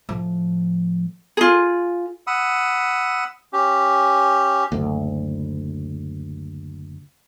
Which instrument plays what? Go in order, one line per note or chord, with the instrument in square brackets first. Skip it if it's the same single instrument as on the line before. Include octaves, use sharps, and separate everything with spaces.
[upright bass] A2 F3
[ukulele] F4 G#4
[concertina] F#5 B5 D#6 E6
C#4 G4
[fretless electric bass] F#1 D2